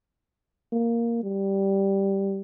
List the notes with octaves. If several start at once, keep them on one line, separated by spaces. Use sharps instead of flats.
A#3
G3